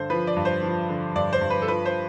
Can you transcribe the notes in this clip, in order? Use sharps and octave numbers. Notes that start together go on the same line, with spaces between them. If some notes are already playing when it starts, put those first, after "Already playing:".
Already playing: G2 D3 C5
F3 B4
D5
G2
C5
F3
D3
G2 D5
C5
G2
B4
A4
F3 B4
C5